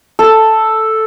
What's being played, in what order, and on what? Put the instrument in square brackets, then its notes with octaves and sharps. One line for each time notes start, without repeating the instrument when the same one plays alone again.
[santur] A4